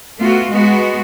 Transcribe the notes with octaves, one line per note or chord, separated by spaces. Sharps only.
A3 B3 F4 F#4
G#3 B3 F#4